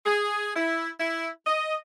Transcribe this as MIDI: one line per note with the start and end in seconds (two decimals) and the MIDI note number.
0.05 0.51 68
0.56 0.89 64
1.00 1.28 64
1.46 1.76 75